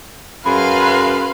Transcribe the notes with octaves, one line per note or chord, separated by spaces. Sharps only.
F#2 G#4 B4 F5 B5 C6